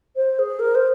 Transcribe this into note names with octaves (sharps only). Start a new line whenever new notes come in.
C5
G#4
A#4
C5